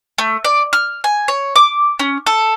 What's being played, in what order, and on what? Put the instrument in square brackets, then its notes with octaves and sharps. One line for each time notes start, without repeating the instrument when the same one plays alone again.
[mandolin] A3
D5
F6
G#5
C#5
D6
C#4
A4